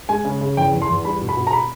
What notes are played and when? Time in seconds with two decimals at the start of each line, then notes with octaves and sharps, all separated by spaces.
0.09 G#3 G#5
0.25 C#3
0.41 C#3
0.57 E2 G5
0.73 E2
0.82 C6
0.89 E2
1.05 G3 B5
1.21 B2
1.29 B5
1.37 B2
1.47 A#5
1.53 B5